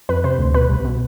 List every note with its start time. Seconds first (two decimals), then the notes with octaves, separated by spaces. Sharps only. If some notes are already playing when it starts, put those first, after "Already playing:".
0.09 F2 B4
0.24 C3 C5
0.39 D2
0.54 B2 B4
0.69 C2
0.85 B2